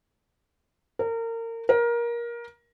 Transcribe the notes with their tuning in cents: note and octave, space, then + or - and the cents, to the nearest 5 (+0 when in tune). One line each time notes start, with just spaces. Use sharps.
A#4 -30
A#4 +20